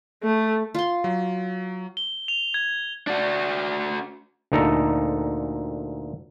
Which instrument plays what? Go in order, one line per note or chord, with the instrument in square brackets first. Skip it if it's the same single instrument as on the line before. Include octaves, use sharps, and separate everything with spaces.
[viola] A3
[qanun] F4 C6
[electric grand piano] F#3
[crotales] G7
F7
G#6
[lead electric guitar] D4 F#4
[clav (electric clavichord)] D2 A#2 D#4 A4 A#5